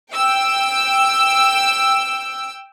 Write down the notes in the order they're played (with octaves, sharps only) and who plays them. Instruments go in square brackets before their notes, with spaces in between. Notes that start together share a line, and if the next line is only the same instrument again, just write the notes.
[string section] G5 E6